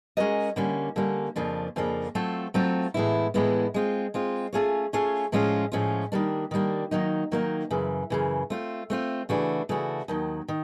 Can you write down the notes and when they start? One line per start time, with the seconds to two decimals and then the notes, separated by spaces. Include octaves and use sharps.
0.17 G#3 C#4 F#4 A#4 D#5
0.56 D3 G3 A#3 C#4
0.96 D3 G3 A#3 C#4
1.36 F2 C#3 F3 A#3 D4
1.76 F2 C#3 F3 A#3 D4
2.15 F#3 A3 C4 F4 A4
2.54 F#3 A3 C4 F4 A4
2.94 A2 E3 G#3 B3 E4
3.34 A2 E3 G#3 B3 E4
3.74 G#3 C4 F4
4.14 G#3 C4 F4
4.53 A3 C#4 F4 G#4 C#5
4.93 A3 C#4 F4 G#4 C#5
5.32 A2 F3 G#3 C#4 F4
5.72 A2 F3 G#3 C#4 F4
6.12 D#3 G3 A#3 D4
6.51 D#3 G3 A#3 D4
6.91 D#3 F#3 A#3 D#4
7.32 D#3 F#3 A#3 D#4
7.71 F#2 C#3 E3
8.10 F#2 C#3 E3
8.50 A3 C4 F4
8.90 A3 C4 F4
9.29 C#3 E3 A3 D4 F#4
9.69 C#3 E3 A3 D4 F#4
10.08 D#2 D#3 F#3
10.48 D#3